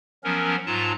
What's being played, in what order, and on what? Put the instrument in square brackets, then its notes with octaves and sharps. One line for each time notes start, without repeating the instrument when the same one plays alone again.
[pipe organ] F3 F#3 B3 C#4 A#4
G#2 F#3 F4 A5 A#5